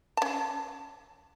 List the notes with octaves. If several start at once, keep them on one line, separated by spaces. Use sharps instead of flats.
C#4 A5